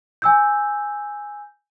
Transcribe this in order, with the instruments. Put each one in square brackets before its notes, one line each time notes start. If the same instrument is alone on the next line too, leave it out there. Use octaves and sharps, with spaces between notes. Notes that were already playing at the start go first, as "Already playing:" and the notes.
[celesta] G#5 E6 G6